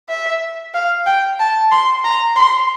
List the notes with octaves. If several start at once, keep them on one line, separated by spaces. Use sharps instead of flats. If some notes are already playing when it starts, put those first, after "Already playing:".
E5
F5
G5
A5
C6
A#5
C6